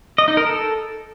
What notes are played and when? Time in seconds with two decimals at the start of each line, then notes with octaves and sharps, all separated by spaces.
0.18 D#5
0.28 D#4
0.37 A#4
0.47 A4